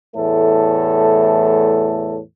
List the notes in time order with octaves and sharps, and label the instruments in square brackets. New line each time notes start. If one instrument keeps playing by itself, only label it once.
[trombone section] E2 A2 A3 A4